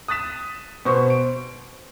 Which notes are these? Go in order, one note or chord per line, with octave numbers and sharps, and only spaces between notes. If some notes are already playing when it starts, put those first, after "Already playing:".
D#6 F#6 A6 B6 E7
B2 C5 C#6
D7